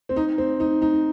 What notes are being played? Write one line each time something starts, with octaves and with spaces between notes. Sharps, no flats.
C4
D#4
C4
D#4
D#4